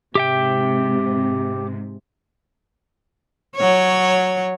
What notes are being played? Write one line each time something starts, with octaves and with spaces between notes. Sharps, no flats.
G#2 C3 G4 E5 G5
F#3 C#5